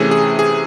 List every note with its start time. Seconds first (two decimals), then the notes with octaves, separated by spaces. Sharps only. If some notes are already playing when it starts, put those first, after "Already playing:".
Already playing: C3 E3 A3 C#4 G#4
0.11 G#4
0.39 G#4